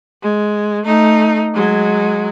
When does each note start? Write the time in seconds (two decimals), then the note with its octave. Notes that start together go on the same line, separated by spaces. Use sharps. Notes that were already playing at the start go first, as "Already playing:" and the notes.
0.23 G#3
0.85 A3 D#4
1.55 F#3 G#3